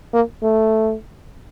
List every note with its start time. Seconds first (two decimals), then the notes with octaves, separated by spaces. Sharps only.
0.13 A#3
0.43 A3